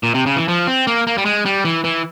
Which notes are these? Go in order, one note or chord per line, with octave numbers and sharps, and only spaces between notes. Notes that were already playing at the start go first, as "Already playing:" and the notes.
A#2
C3
C#3
E3
F3
C4
A#3
A#3
G3
G#3
G3
E3
E3